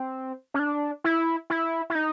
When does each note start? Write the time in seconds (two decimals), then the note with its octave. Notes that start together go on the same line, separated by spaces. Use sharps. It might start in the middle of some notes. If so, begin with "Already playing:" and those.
Already playing: C4
0.54 C#4
0.59 D4
1.04 E4
1.50 E4
1.90 E4
1.95 D#4